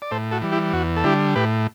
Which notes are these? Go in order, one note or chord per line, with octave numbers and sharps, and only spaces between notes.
D5
A2 A4 C5
F#4 A4
E3 G3
E4 G4
E2 F#4
A4
D3 G3 E4 G4
A2 G4 B4